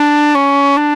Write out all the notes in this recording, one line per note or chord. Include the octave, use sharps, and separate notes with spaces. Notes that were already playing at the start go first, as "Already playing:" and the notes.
Already playing: D4
C#4
D4